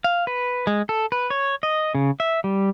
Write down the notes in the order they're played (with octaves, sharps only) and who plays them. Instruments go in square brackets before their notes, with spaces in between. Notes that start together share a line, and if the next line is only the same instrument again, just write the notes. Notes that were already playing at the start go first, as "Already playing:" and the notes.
[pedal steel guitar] F5
B4
G#3
A4
B4
C#5
D#5
C#3
E5
G3